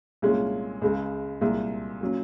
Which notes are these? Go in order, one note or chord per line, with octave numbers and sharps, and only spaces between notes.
C2 A#2 G#3 C#4 F4
C#2 C#3 G#3
C2 A#2 G#3
A#2 F#3 C#4